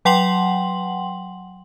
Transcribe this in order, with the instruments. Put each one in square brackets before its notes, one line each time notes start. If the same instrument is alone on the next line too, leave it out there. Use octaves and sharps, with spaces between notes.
[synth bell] F#3 F#5 G5 C6 F#7